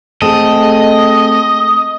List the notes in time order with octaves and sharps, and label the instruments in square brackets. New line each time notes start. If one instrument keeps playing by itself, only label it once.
[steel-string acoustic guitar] A3 C4 [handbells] G#4 A5 [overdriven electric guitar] D#5